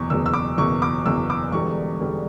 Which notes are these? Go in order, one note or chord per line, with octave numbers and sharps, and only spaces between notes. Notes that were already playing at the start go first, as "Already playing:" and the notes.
Already playing: F#1 E2 B2 C#6
F#1 E2 B2 E6
E6
D6
F#1 E2 B2 C#6
D6
F#1 E2 B2 E6
D6
E1 E2 D3 G3 C#6
E1 E2 D3 G3